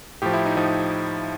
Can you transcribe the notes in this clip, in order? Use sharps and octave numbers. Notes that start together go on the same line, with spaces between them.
A2 F3 G4
E4
D#4
A2 F3 D#4